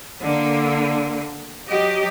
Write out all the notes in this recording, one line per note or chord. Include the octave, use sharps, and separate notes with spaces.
D3 A#3
F#3 G4 D#5